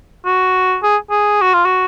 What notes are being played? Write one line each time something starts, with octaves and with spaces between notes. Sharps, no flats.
F#4
G#4
G#4
F#4
F4
F#4